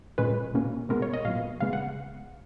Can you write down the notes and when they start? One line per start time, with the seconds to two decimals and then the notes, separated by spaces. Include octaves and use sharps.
0.18 A#2 G#3 C#4 B4
0.54 B2 A#3 C#4
0.89 B2 G#3 B3 A#4
1.02 C#5
1.14 D#5
1.25 A#2 F#3 B3 F5
1.60 C#3 G#3 B3 F5
1.73 F#5